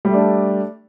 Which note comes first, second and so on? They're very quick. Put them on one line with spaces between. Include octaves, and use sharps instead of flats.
G3 A3 D4 A4